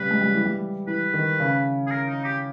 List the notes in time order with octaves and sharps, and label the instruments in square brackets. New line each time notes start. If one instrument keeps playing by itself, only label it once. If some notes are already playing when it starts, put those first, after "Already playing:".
Already playing: [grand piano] C#3 G3 [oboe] B4
[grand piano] G#3
G3
E3
G3
[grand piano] E3 [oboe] B4
[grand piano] D#3
C#3
[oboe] G#4
A#4
D#4
G4